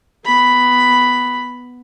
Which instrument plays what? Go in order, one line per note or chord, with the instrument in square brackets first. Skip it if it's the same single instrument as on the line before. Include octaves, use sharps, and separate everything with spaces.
[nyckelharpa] B3 B5